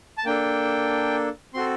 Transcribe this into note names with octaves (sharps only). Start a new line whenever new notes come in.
A5
A#3 D4 A4 G5
C4 F#4 A4 C6